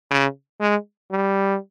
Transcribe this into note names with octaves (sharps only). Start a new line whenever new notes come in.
C#3
G#3
G3